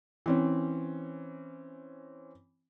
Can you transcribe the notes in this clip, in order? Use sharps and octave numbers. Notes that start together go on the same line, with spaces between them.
E3 C4 C#4